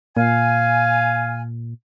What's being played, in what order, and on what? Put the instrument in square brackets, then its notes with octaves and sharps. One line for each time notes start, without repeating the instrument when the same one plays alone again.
[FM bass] A#2 [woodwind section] F5 G#5